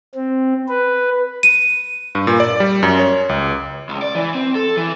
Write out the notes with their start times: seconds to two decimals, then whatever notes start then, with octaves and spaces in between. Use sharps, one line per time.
0.15 C4
0.68 B4
1.43 D#7
2.15 G2
2.27 A#2
2.40 D5
2.60 G3
2.83 F#2
2.99 C#5
3.29 C#2
3.89 C#2
4.02 D5
4.15 E3
4.34 C4
4.55 A4
4.77 E3